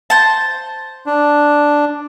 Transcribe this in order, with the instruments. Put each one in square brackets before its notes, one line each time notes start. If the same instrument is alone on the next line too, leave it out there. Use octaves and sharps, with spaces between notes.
[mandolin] C5 A5
[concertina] D4